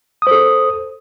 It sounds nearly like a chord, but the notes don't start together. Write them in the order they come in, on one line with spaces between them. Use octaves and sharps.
D#6 C5 A4